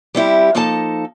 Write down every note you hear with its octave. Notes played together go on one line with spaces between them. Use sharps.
G3 C4 E4 G4
F3 A#3 D#4 A4 A5